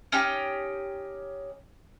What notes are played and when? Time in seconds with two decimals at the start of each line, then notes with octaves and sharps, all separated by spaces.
0.12 C#4 D#4 G4 D#5